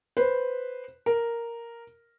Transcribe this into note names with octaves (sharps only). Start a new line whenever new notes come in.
B4 C5
A#4